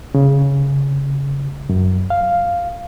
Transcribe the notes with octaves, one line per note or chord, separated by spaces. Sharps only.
C#3
F#2
F5